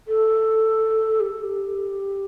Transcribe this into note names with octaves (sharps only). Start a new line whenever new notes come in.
A4
G4
A4
G4